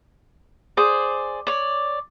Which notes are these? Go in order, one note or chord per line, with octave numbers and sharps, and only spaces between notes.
G#4 C5 D5
C#5 D5